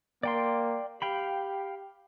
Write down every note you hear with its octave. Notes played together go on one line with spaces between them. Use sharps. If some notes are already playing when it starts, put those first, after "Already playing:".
A#3 D5 G5 C6
G4 F5 G5 B5